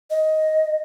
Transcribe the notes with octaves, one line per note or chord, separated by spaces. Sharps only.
D#5